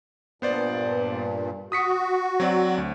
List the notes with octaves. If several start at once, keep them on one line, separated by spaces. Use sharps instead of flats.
G2 A#2 B3 C5 D5
F#4 D#6 B6 C#7
F#3 C4 D5
D2